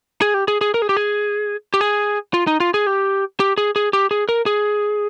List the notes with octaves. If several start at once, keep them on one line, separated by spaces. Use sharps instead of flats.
G#4
G4
G#4
G#4
A#4
G#4
G4
G#4
G4
G#4
F4
D#4
F4
G#4
G4
G4
G#4
G#4
G4
G#4
A#4
G#4